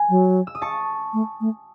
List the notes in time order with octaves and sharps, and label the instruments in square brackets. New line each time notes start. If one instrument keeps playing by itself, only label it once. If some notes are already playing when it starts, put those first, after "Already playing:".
Already playing: [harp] G#5
[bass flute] F#3
[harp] E6
D#6
A5 C#6
[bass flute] A3
A3